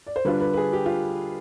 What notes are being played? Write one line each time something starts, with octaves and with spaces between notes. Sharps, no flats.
D5
C5
D3 G3 D4 F4 B4
B4
B4
G#4
G4
F4